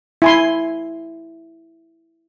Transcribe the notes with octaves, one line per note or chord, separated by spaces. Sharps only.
E4 G#5 C6